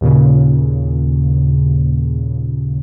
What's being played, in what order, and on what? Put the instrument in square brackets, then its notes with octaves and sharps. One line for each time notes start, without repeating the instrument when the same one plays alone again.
[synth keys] D#2 A#2 C#3